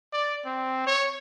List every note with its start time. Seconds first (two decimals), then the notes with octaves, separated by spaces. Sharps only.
0.12 D5
0.45 C4
0.86 C#5